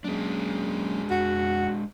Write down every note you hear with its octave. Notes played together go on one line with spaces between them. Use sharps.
F#3 G#3 A#3 C#4 D4
F2 F#4 F#5 C#7